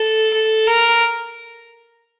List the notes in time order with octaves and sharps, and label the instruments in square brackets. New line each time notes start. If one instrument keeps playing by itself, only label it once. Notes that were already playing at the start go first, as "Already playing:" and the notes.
Already playing: [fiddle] A4
A4
A#4